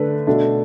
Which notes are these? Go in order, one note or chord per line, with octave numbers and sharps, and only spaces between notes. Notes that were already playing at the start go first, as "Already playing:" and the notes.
Already playing: D3 A3 D4 B4
B2 A3 D4